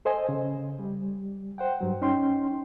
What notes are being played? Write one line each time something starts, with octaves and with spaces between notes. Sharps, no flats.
A4 C5 D#5 G#5
C#3
G3
C5 F#5 G5
G2 F#3
C#4 D#4 G5 C6